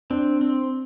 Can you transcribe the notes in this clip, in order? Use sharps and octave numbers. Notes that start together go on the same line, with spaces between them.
C4 D4
C4